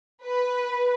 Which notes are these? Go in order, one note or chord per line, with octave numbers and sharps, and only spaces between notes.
B4